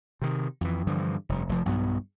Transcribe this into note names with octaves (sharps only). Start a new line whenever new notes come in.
C3 D#3
F2 E3
G2 D3 E3 F3
F1 G2
F1 F3
B1 G2 F#3 B3